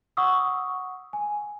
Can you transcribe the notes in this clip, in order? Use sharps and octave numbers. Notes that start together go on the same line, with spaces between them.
F#5 C#6 D#6 E6
G#5